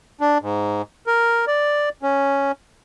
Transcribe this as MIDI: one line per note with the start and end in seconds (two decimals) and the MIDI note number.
0.21 0.38 62
0.42 0.82 44
1.07 1.45 70
1.47 1.89 74
2.02 2.52 61